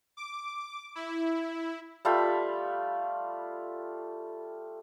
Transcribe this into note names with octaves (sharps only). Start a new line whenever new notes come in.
D6
E4
G3 A3 F4 B5